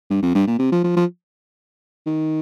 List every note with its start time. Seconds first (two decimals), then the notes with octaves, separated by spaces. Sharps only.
0.10 G2
0.22 F2
0.35 G2
0.47 A#2
0.59 C3
0.72 F3
0.84 F3
0.96 F3
2.06 D#3